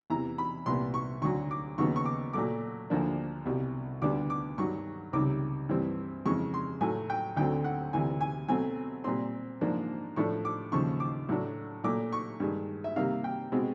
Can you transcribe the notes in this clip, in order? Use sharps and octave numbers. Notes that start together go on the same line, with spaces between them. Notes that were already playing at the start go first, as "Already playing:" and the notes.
E2 C3 E3 A#5
B5
C2 A#2 G3 B3 C6
C#6
D2 D3 F#3 C#6
D6
D#2 C#3 F#3 B3 C#6
C#6
D6
A#2 F#3 A3 D6
D2 D3 F3 A#3 D4
C2 B2 G3
D2 D3 G3 B3 D4 D6
D6
G2 D#3 F#3 C#6
C#2 C3 D#3 G3 D6
G2 E3 G3 C4
F2 C#3 E3 G#3 C#6
C6
A2 F#3 A3 G#5
G5
D2 D3 F#3 A3 C4 G5
F#5
D2 C3 E3 G#5
G#5
B2 F#3 A3 C4 G#5
A#2 G3 C4 C6
G#2 F3 A#3 D4
A2 F3 A3 D4 C#6
D6
D#2 C#3 F3 C#6
D6
A2 F#3 A3 D4
A#2 F#3 A3 D6
C#6
G2 D#3 G#3
E5
C3 D#3 G3 A#3 F5
G5
B2 G#3 C4